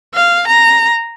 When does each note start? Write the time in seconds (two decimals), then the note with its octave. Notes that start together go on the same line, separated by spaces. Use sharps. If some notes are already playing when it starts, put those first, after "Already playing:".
0.14 F5
0.47 A#5